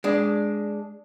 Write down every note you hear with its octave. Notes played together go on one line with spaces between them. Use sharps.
G#3 D4